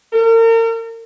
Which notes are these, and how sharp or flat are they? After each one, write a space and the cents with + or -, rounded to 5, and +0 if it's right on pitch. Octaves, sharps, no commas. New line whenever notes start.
A#4 -40